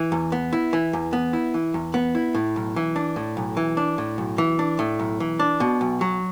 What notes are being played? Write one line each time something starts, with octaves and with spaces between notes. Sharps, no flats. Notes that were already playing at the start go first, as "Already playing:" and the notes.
Already playing: E3
E2
B3
E4
E3
E2
B3
E4
E3
E2
B3
E4
A2
B1
E3
D4
A2
B1
E3
D4
A2
B1
E3
D4
A2
B1
E3
D4
B2
B1
F#3